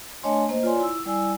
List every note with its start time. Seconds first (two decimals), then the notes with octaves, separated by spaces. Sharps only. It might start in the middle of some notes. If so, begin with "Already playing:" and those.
0.23 A3 D4 C#5 D#5 G#5 C6
0.49 A#3 C5 D#5
0.63 F4 C#5 D5 G#5 C6
0.80 E4 E6
1.05 G3 E4 D5 G#5 E6